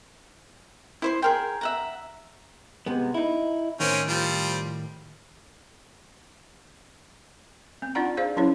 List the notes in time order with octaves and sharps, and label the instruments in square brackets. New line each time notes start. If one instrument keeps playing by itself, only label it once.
[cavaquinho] E4 C5 C6
G#4 A#4 G5
E5 F#5 A#5
[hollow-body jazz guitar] C3 G#3 B3
D#4 E4
[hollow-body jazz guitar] A2 D#3 [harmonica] C4 C#4 A#4
[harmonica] F3 G3 C4
[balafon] C4
D4 D#4 F4 D5 F#5 A#5
G#4 C5 D5 F5
F#3 C#4 E4 C#5